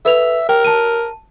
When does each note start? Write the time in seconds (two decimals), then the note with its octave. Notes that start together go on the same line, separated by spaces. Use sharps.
0.05 A4 B4 E5 F7
0.49 A#4 G5
0.65 A5 D#7